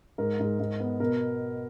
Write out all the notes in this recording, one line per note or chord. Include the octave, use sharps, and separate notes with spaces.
G#2 A#4
G#2
G#2
B3
B2 A#4